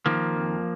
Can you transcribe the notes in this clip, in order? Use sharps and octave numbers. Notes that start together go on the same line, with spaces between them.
D#3 F3 A#3
F2